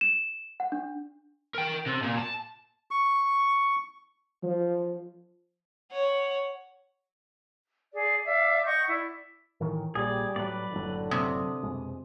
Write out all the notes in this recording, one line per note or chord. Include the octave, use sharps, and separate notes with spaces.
E7
F#5
D4
A#4 G5
C3
A#2
A5
C#6
F3
C#5 F#5
G#4 D5
D5 E5 F5
D#5 F#5 C#6 G6
E4 D5
A2 D#3 E3 A#4
A#1 A#2 G3 G#4 D5
A2 F#3 B4 D5
F#1 A2 D3 F#3
C3 D#6
F2 B2 G#3